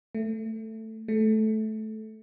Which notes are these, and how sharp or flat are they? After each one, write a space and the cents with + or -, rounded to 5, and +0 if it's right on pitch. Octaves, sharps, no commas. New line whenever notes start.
A3 +10
A3 -15